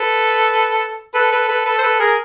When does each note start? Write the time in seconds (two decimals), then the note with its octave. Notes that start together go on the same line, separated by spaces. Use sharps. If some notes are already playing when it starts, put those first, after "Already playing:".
Already playing: A4 B4
1.14 A4 B4
1.31 A4 B4
1.48 A4 B4
1.65 A4 B4
1.78 C5
1.82 A4 B4
1.99 G#4 A#4